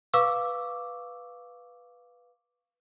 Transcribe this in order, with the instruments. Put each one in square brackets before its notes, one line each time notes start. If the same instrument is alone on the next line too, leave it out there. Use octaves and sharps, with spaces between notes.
[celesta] B4 F5 C#6 D6 E6